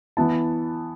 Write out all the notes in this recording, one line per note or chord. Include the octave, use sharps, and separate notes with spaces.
E3 B3 E4 A5